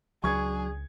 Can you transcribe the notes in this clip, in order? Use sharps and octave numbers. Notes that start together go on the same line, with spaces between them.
C#2 F#3 D4 G#4 C#6 G#6